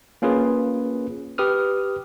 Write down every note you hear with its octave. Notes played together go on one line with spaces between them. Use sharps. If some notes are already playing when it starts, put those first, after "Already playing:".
A#3 C#4 F4 G#4 B4
G4 B4 D#6 F6